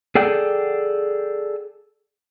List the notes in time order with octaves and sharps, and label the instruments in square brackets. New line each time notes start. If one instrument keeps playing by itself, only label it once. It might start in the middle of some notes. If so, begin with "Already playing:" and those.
[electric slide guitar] G#4 A4 D5 F#5 G5